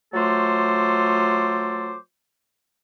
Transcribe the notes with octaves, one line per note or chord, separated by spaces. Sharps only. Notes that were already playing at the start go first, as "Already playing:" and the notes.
F#3 A3 F4 A4 C5 D6